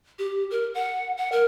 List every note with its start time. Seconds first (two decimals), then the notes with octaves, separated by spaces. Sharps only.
0.19 G4
0.51 A#4
0.74 F#5
1.17 F#5
1.32 A#4